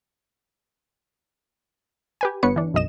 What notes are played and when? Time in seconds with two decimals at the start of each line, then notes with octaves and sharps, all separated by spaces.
2.21 G4 B4 G#5
2.43 G1 B3 B4 C#5 C#7
2.56 E3 D4
2.74 B1 F#2 D#5 E7